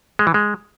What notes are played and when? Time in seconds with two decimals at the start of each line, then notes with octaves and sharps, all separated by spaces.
0.19 G#3
0.27 E3
0.34 G#3